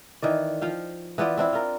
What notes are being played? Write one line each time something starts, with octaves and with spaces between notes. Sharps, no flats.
D#3 E3 D5
F3 F5 G5
E3 B3 F4 D5
C4 D4 E4
F4 A#4